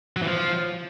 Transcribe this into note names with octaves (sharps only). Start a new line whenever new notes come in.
F#3
E3
F3